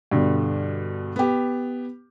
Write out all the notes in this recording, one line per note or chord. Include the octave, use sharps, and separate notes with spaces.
G2 B2 D3
B3 G4